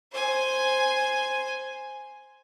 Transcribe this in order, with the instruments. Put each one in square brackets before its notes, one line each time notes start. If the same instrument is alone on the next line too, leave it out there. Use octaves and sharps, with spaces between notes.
[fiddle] C5 G#5